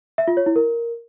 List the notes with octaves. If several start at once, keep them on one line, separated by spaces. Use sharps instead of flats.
E5
F4
C#5
E4
A#4